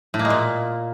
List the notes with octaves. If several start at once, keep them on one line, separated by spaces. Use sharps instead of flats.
A2
A#3
G#3
A#2